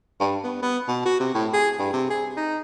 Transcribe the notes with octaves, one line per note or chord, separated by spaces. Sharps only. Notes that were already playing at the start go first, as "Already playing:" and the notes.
G2
B3
B3
B2
F#4
C3
A2
G#4
G2
C3
G#4
D#4